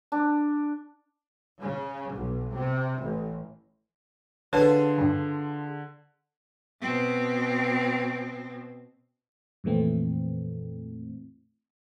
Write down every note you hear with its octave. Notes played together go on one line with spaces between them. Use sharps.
D4
C#3
B1
C3
A1
A1 D3 F4 G#4 A4 B4 C#5 A5
G2 C#3
B2 C4
F2 A#2 E3 A3 C4